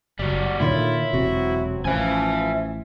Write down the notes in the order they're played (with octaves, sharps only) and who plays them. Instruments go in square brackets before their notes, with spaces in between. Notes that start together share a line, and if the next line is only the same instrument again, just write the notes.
[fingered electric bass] F#1 [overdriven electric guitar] G3 F#4
[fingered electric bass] A#2 D3 D#3 [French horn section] A3 A#3 C#5 [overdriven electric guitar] E4 [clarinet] F4
[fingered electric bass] E1 C3 [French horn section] F#3 C4 [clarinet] F#4
[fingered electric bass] A1 [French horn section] F3 [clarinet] C#4 [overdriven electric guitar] E5 G#5